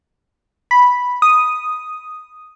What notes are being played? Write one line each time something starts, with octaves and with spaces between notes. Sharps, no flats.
B5
D#6